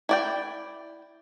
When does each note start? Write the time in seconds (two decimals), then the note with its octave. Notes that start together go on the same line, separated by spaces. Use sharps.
0.09 E4 D5 G5